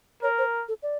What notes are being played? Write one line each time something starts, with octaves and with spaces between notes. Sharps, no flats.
A#4 C#5
C5
A4
D5